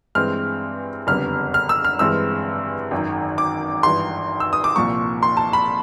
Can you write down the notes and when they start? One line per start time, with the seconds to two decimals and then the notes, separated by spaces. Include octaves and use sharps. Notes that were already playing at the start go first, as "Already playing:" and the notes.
0.15 G2 E3 G#3 C4 F6
1.07 F#1 F2 D3 G3 B3 F6
1.54 F6
1.69 E6
1.84 F6
1.99 G2 E3 G#3 C4 E6
2.91 G#1 F#2 D#3
3.38 D6
3.83 G#1 G2 E3 C6
4.40 E6
4.53 D#6
4.64 D6
4.76 C2 A#2 F3 A#3 C#6
5.23 C6
5.37 A5
5.53 B5